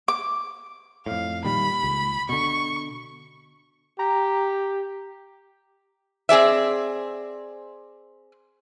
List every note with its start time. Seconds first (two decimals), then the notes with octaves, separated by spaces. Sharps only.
0.08 D6
1.06 F2 A2 F5
1.44 A#2 D#3 G3 B5
1.83 C#2
2.29 B2 D3 C#6
3.99 G4 A#5
6.29 C4 G#4 D5 E5